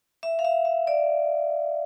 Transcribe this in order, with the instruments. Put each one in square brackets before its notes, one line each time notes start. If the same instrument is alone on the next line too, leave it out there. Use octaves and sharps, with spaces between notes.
[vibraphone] E5
F5
E5
E5
D5